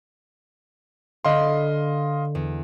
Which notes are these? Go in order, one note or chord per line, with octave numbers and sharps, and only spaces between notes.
D3 D#5 F5 B5 C6
E2